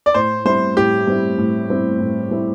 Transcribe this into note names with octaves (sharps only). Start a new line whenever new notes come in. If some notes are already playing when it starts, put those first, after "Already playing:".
D5
A2 C5
G3 C4 E4 C5
A2 G4
G3 C4 E4
A2
G3 C4 E4
A2
G3 C4 E4